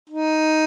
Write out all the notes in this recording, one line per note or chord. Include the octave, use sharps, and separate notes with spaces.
D#4